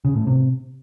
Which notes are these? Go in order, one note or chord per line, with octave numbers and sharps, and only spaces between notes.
C#3
A2
C3